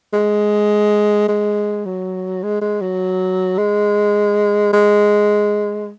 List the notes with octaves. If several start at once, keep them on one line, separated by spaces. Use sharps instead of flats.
G#3
G#3
F#3
G#3
G#3
F#3
G#3
G#3